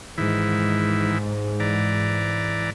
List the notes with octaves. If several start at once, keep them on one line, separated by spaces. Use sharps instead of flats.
G#2 D#3 E3 E4
E3 D5 A#5